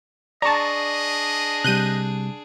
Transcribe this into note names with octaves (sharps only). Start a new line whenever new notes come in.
D4 G#4 D5 D#5 A5 A#5 C#6
C3 G3 F#6 G6 D#7